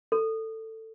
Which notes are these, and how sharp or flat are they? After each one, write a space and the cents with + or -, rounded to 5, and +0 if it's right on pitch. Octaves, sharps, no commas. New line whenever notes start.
A4 +15